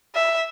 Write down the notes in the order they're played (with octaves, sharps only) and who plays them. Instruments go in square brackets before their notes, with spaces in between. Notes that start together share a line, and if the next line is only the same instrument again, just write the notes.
[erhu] E5